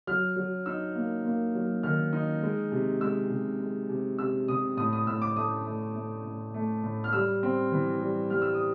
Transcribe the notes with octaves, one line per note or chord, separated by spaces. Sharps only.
F#3 F6
F#3
D#4 E6
A#3
A#3
F#3
D#3 F6
D#4
G#3
C3
G#3 E6
C3
G#3
C3
C3 E6
C3 D#6
A2 D#6
D#6
A2 E6
D6
A3 D#6
A3
A3
A2
A3
A2
F6
G3 E6
C4
E3
G3
G3 F6
E6
D#6